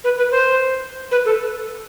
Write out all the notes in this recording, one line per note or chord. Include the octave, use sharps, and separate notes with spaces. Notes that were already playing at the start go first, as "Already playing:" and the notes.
B4
B4
C5
B4
A4